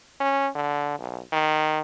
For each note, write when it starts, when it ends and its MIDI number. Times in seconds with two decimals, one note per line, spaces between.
0.20 0.48 61
0.55 0.95 50
0.99 1.20 35
1.33 1.81 51